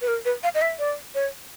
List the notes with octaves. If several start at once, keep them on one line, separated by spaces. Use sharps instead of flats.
B4
A#4
B4
F5
D#5
E5
D5
C#5